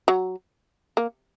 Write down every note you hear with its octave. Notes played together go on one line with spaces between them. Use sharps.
F#3
A#3